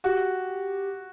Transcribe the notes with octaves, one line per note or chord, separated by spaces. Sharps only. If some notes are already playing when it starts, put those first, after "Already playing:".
F#4 G4